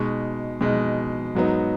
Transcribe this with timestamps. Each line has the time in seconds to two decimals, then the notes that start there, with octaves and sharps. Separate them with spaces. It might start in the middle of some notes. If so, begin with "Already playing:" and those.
Already playing: B2 G#3 D#4 C#6
0.61 B2 G#3 D#4
1.35 G#2 F#3 B3 D#4